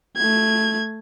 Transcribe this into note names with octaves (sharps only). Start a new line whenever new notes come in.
A3 G#6